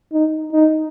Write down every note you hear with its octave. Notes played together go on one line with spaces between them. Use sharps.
D#4
D#4